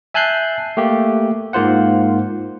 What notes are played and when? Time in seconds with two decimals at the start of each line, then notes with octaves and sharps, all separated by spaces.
0.14 E5 G#5 A5 F#6 G6 C7
0.77 A3 A#3 G4
1.53 G#2 A#3 F4 C5 F#5